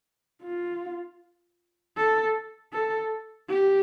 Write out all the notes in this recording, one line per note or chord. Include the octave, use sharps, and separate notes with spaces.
F4
A4
A4
G4